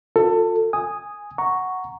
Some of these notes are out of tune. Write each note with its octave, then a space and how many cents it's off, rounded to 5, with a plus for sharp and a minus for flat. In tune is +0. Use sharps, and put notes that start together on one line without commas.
F4 +40 A4 +25
G#5 -5 D#6 +0
F#5 +0 A#5 +0 C#6 +0